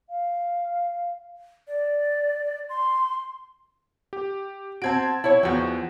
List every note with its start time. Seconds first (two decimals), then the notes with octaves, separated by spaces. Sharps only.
0.10 F5
1.68 D5
2.69 C6
4.13 G4
4.82 C4 F#4 A5 G#6 D7
5.24 E4 C#5
5.43 E2 F3 F#4 G5